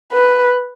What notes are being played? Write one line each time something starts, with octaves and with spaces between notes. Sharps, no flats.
B4